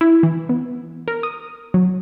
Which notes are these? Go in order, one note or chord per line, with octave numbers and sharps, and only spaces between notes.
E4
E3
B3
A#4
D#6
F#3